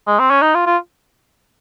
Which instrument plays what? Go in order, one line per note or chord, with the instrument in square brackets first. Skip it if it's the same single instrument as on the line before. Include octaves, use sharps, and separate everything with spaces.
[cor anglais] G#3
C4
C#4
D#4
F4
F4